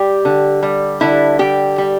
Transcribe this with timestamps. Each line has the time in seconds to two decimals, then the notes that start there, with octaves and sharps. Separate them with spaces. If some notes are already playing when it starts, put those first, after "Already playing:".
Already playing: G3 G4
0.25 D3
0.63 G3
1.01 D3 E4
1.39 G3 G4
1.78 G3